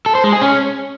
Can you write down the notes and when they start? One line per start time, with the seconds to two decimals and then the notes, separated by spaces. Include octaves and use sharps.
0.06 A4
0.15 C5
0.24 G#3
0.33 G#4
0.41 C#4